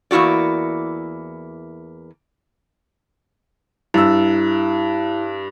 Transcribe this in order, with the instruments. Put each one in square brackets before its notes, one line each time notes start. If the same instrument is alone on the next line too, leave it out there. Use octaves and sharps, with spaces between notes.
[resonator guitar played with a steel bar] E2 A#3 E4 F#4 D5
[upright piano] G2 E6 [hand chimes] E4